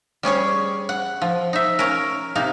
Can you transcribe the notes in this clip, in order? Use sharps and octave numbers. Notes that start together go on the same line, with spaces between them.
G3 C#4 G#4 C#5
F#5
F3
D#4 E5
C#4 A#4
C3 A#3 D#4